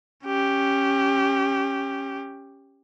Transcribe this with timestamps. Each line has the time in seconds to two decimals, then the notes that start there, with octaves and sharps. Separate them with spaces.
0.24 C#4 G4